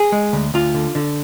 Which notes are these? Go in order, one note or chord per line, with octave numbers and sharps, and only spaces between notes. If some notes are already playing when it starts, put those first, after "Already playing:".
Already playing: G#4
G#3
D2
D2 F4
D3
D3